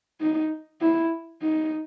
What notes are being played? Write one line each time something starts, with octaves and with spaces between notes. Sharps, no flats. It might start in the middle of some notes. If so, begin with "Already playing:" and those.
D#4
E4
D#4